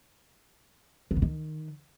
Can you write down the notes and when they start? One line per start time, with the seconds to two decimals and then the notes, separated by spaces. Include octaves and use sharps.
1.11 D#3
1.16 B2
1.22 D#3